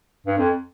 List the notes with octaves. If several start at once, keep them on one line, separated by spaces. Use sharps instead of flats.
G2
F2